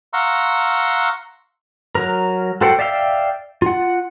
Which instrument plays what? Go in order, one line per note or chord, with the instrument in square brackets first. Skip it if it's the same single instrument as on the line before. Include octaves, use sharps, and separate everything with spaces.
[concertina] F5 F#5 A#5 C6 C#6 E6
[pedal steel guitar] F#3 A#4
F#4 A4 C5 F#5 G5
D5 E5 F5 G5 E6
F4 F#5